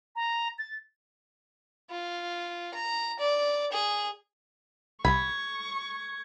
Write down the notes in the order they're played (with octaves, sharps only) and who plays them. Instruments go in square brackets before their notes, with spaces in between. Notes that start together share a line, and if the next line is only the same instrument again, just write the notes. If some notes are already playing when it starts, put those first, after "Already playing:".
[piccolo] A#5
A6
[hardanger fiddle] F4
A#5
D5
G#4
[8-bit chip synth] C2 [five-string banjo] B5 [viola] C#6 [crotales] G#6